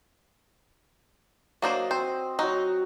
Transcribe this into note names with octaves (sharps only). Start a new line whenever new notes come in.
F#3 A#3 D4 C5 D#5 D#6
C4 C5
F#3 D#4 F#4